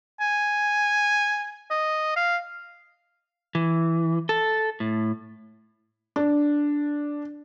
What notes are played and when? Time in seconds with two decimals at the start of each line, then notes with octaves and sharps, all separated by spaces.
0.21 G#5
1.71 D#5
2.16 F5
3.55 E3
4.29 A4
4.80 A2
6.16 D4